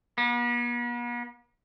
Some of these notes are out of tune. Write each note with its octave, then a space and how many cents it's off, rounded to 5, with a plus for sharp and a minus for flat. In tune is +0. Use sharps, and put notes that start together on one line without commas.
B3 -45